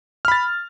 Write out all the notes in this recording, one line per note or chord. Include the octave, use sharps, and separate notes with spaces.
B5 F6 A6